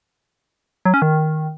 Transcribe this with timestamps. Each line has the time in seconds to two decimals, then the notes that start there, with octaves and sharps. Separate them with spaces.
0.85 F#3
0.94 C#4
1.02 D#3